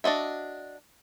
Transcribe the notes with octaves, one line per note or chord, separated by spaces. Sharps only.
D4 F#4 D#5 E5